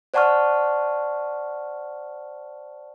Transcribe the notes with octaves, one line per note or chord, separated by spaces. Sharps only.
C5 D5 F#5 A5 C#6 F6